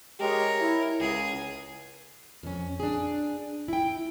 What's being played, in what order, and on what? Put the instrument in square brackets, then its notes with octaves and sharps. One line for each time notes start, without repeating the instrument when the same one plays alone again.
[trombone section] G#3 G4 [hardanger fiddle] A#4 C#5
[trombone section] E4
[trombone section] C#2 [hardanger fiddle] G#4
[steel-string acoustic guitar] F2 C#4
D4 G#4
E4 G5